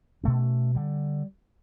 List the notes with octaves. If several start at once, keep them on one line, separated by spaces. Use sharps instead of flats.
B2 A3 C#4
D3 G3